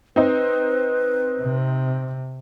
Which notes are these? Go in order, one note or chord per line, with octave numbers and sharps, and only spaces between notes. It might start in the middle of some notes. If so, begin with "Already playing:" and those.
C4 D#4 B4
C3